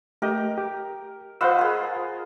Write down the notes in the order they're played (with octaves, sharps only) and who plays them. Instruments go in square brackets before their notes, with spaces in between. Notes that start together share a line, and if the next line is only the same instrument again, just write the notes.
[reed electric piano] A3 G4 D#5 [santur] A#4
[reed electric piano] G4
[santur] F4 B4 D#5 [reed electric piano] C5 F#5 E6
[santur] G#4 A#4